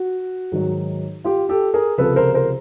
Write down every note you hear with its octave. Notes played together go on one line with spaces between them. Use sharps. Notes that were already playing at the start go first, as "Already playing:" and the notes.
Already playing: F#4
G#2 D#3 F#3
F4 G4
G4 A4
G#4 A#4
C#2 C3 F3 A4 B4
A#4 C5
A#4 C5